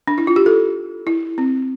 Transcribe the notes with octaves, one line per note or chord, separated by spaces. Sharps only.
D4
E4
F4
G4
A4
E4
C4